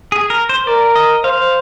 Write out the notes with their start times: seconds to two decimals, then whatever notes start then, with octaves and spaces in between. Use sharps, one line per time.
0.12 G#4
0.30 A#4
0.49 C5
0.67 A#4 D5
0.95 D#5
1.24 C5 F5